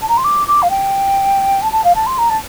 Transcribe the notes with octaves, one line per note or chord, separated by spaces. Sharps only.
A5
A#5
C6
D6
D6
F5
G5
A5
A5
F5
A5
C6
A#5
A5